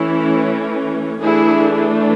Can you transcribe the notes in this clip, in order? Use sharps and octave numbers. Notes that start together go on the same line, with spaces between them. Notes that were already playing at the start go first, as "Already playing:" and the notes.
Already playing: E3 A3 C#4 E4
E3 A3 D4 E4 G#4